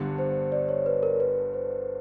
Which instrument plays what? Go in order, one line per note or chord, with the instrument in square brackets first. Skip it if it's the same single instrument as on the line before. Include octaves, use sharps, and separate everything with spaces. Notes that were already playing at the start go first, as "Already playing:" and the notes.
Already playing: [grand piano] G1 G2 D3
[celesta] C5
D5
C#5
B4
A#4
B4
C5